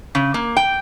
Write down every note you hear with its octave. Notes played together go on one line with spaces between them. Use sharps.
C#3
A#3
G5